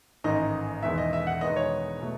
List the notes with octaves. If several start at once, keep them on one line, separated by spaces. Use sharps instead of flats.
A1 G#2 D#3 D#5
E1 E2 D#3 G#3 B3 E5
D#5
E5
F#5
E1 E2 D#3 G#3 B3 D#5
C#5
B2 F#3 A3